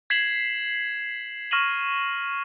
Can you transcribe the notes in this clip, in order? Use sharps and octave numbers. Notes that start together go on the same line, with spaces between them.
G#6 B6 C7 E7 F#7
C#6 F6 A#6 D#7 E7 F#7